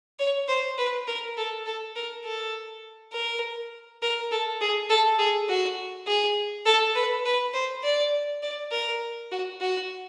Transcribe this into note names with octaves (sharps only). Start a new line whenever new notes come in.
C#5
C5
B4
A#4
A4
A4
A#4
A4
A#4
A#4
A4
G#4
A4
G#4
F#4
G#4
A4
B4
B4
C5
D5
D5
A#4
F#4
F#4